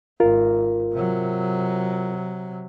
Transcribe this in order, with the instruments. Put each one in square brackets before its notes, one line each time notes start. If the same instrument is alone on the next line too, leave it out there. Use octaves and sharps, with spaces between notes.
[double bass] G#1 [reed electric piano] F4 A#4
[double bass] C3 F#3